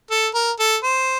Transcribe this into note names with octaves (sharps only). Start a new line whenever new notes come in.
A4
A#4
A4
C5